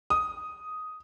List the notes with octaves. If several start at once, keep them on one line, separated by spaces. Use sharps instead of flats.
D#6